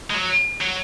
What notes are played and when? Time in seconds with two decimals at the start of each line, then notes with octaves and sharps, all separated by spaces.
0.10 G#3
0.15 F#3
0.61 F#3